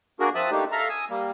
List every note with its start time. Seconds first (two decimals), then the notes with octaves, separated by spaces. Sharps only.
0.20 A#3 D4 F#4 G#4 A#4
0.35 F3 C4 E5 A5 D#6 F#6
0.51 A3 A#3 D4 D#4 G4
0.72 A4 E5 F5 A#5
0.89 G#5 D#6 E6
1.10 G3 A#3